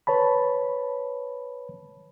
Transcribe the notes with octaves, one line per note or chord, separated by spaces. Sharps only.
B4 C#5 A5 B5